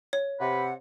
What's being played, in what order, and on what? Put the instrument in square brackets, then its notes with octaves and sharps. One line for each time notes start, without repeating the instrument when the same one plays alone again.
[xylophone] C#5
[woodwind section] C3 [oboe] B4 [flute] F#5